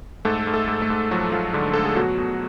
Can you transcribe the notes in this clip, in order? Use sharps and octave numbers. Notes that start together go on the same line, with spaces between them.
G#2 A3 A4
G#2
A3 A4
G#2
A3 A4
G#2
F3 F#3 F#4
G#2 F3 F4
G#2 D3 D4
G#2 A4
G#4
B2 F#3 F#4
B2